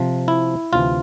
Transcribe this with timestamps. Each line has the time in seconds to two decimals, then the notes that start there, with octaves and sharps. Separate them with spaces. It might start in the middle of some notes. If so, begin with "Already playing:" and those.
Already playing: C3 F3 C4
0.28 E4
0.73 D2 C3 E3 F4